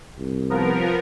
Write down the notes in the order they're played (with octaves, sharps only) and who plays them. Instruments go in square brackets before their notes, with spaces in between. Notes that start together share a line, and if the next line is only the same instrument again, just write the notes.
[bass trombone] C2
[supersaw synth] F3 B3 A#4